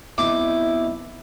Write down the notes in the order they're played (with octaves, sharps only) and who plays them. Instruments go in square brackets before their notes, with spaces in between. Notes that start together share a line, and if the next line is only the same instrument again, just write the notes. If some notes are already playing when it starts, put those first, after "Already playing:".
[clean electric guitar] B2 C4 D#4 [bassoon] E4 [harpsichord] D6